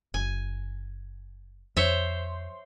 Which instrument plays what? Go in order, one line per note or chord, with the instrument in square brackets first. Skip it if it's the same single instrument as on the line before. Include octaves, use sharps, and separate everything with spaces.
[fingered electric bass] F#1 [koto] G#5
[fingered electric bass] F2 [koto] C5 C#5 E5